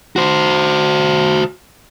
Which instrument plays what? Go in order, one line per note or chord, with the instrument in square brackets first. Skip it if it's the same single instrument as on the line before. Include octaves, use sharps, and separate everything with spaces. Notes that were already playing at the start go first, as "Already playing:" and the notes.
[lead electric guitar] F#4 C5